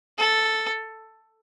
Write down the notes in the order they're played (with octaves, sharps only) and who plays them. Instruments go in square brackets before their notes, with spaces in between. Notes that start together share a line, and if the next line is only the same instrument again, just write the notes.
[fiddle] A4